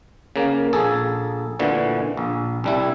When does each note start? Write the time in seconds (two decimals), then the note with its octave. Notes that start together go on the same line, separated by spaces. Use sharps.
0.36 C#3 A#3
0.73 A#1 G#4 A4
1.59 D2 A#2 D3 E3
2.17 A#1
2.64 C2 G3 E4